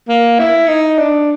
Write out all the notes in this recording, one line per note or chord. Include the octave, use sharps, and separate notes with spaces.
A#3
E4
D#4
D4